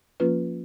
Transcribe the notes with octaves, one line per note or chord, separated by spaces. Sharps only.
F3 A#3 C#4 F4 B4